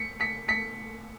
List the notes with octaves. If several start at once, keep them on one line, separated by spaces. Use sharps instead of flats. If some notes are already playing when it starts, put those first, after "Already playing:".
Already playing: B6 C#7
B6 C#7
B6 C#7